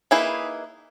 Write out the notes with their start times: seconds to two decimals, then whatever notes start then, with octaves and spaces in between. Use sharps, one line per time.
0.11 A#3 D#4 E4 G#4 B4